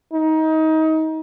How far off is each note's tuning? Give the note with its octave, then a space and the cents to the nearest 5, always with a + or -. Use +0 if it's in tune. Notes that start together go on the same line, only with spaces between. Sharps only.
D#4 +25